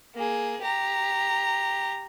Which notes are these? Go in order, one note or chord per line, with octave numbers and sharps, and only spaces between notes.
A#3 G#4
G4 A#5